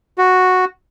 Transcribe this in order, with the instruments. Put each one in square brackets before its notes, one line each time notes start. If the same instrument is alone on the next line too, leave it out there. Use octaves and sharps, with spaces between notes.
[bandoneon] F#4